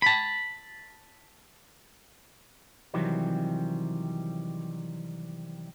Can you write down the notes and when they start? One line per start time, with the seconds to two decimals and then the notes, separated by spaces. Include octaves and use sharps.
0.02 A5 B5
2.94 C3 D#3 E3 F#3 G3 C4